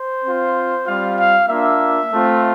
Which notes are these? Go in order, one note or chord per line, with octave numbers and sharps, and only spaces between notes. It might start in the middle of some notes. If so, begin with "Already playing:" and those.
Already playing: C5
C4 F4
G3 C4 F4 F5
F5
A#3 D4 F4 E5
A3 C4 F4